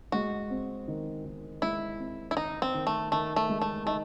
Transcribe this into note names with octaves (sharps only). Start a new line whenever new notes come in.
G#3 F#4
C4
D#3
D#3
G#3 E4
C4
E4
D#3 D#4
C4
D#3
A3
D#3 A3
A3
G#3
A3
A3 D#4